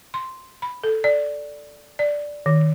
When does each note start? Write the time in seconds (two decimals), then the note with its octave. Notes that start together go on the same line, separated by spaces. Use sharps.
0.14 C6
0.62 B5
0.84 A4
1.04 D5
1.99 D5
2.46 D#3